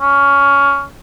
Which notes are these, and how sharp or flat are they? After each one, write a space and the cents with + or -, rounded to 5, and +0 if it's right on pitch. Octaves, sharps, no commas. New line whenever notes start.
C#4 +15